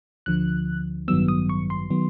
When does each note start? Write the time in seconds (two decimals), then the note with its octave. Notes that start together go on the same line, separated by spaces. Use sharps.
0.26 D2 D3 F3 F#6
1.08 A1 G2 D#3 F#3 B3 E6
1.28 D#6
1.49 C#6
1.70 C6
1.90 D#3 F#3 B3